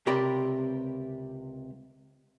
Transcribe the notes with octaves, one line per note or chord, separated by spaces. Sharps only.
C#2 C3 G4 A#4 D5 B5